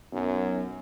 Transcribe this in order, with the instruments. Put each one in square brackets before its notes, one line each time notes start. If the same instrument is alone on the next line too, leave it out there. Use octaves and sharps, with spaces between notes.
[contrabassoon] B1 [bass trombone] F#2